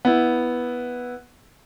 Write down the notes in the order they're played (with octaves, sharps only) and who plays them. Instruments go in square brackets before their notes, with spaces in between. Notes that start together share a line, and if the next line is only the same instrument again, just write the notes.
[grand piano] B3 E4